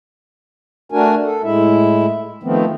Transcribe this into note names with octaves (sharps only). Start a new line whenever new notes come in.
A3 D4 F#4 A#4 G#5
A4
A2 G#3 E4 E5
D#3 F3 A3 B3 C4